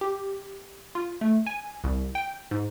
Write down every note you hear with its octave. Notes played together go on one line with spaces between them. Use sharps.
G4
F4
A3
G#5
C2
G5
G#2